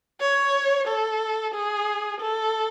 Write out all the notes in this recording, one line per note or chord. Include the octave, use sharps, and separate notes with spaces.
C#5
A4
G#4
A4